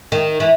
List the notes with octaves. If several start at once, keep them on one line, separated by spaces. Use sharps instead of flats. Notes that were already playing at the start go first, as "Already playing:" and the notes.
D#3
E3